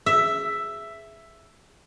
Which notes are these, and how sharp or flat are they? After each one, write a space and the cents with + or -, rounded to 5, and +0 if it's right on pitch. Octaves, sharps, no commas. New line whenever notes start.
E5 +5